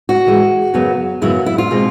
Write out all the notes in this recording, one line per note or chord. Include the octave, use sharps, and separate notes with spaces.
F#4
A2 E3 G#3
F#2 C#3 F#3 B3
F#2 C#3 F#3 B3 E4
E4
F4
B2 G#3 C4 D#4